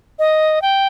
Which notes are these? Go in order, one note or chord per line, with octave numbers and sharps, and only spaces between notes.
D#5
G5